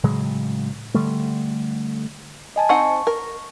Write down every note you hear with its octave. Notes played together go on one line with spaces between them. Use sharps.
A2 C#3 F#3 G#3
D3 G3 A3
D#5 G#5 A5
C4 D#4 F#5 C#6
A#4